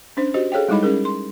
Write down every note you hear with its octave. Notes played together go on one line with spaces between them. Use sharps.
C#4 D4 C5
F#4 G4 C5 D#5
G#4 A4 C#5 F5 G5
G3 G#3 D#4 E4 D#5 B5
C#4 G#4 A#4
C6